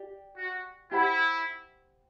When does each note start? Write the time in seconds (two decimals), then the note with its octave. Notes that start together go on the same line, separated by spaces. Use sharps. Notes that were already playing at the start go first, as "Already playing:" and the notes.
Already playing: G4 D5 G5
0.37 F#4
0.91 E4 G4 C5 F#5 B5